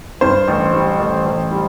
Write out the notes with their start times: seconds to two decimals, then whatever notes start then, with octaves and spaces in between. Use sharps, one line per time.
0.21 G2 C5
0.48 A1
0.73 G3
1.00 A1
1.25 A1
1.51 G3